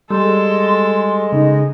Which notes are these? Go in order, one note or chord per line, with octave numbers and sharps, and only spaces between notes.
G3 G#3 A4 C6
C#3 D#4